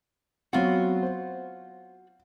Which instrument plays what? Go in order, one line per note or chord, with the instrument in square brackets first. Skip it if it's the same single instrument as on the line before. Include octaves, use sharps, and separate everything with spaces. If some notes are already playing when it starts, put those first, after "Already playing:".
[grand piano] F#3 B3 C4 [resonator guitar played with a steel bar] F4 F#4
[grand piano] C5